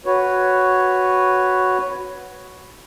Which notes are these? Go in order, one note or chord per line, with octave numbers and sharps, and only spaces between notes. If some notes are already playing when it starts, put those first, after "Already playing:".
F#4 B4 C#5